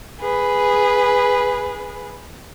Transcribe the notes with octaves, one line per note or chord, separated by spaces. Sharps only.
G#4 B4